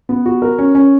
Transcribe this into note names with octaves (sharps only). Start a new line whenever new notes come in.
B3
F#4
A#4
C#4
C#4